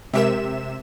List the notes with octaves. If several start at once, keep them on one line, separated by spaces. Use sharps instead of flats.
C3 G#3 G4 A#4 E5 E7